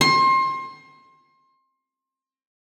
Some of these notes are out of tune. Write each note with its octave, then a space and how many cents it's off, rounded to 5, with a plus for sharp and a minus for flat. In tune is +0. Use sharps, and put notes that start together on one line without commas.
C6 +30